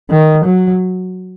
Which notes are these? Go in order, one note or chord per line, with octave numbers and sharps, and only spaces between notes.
D#3
F#3